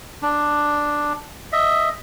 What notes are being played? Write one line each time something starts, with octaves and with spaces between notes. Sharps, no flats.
D4
D#5 E5